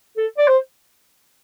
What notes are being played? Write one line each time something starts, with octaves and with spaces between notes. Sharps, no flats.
A4
D5
C5